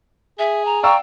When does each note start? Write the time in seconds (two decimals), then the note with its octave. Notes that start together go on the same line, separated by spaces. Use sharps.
0.39 G#4 E5
0.65 A#5
0.83 D5 F5 G5 A#5 C#6 E6